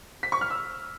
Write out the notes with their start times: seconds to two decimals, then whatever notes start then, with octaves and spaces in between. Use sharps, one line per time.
0.23 B6
0.32 C#6
0.41 F6
0.50 E6